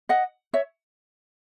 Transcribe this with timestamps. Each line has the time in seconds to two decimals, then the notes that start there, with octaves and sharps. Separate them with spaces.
0.09 D#5 F#5
0.54 C#5 E5